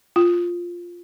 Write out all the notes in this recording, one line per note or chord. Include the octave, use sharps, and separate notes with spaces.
F4